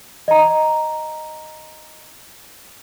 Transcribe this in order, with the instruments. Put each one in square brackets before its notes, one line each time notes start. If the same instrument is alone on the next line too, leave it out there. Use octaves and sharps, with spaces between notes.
[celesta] D#5 A#5